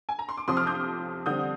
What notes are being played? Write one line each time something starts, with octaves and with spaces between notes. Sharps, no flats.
G#5
A#5
C6
D6
F2 C3 F3 C4 C6 D#6
D6 F6
D#6 G6
D3 G3 C4 D#6 G6